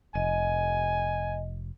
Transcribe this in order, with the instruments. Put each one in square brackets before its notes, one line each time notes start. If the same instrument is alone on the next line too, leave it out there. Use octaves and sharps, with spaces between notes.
[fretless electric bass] F1 [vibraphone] D#5 [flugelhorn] G#5